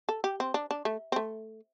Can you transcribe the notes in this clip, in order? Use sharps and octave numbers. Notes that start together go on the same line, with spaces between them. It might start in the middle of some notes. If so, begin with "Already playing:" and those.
A4
G4
C4
D4
D4
A3
C4
A3